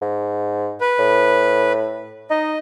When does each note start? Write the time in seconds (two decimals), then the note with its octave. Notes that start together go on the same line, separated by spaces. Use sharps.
0.02 G#2
0.81 B4
0.99 A2
2.31 D#4 D#5